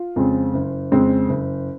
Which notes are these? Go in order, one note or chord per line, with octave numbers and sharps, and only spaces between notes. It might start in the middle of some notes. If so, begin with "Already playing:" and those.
Already playing: F4
F2 C#3 G#3 C4
F#1
F2 C#3 G#3 C4
F#1